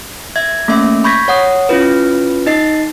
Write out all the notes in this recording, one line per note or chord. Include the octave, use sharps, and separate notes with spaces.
E5 G#6
A3 A#3 C#4 E5
B5 C#6 G6 G#6 A#6 B6
C#5 F#5 D#6
C#4 E4 F4 B4
D#4 D#5 A6 C7